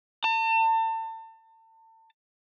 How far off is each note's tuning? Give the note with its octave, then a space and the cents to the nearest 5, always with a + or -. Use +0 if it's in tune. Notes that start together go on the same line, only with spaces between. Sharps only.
A5 +35